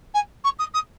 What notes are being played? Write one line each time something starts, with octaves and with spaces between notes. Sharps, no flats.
G#5
C#6
D#6
D#6